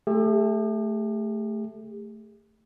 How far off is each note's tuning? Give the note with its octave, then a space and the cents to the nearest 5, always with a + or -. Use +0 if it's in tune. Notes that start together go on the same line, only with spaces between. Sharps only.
A3 +0 G4 +45